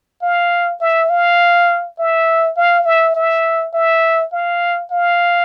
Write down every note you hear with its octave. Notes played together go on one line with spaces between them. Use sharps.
F5
E5
F5
E5
F5
E5
E5
E5
F5
F5